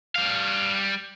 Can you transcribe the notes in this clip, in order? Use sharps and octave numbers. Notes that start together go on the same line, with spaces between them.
G3 F5